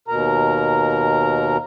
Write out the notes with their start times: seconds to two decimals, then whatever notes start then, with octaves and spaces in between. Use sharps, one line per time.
0.08 D#2 B2 A#4 A#5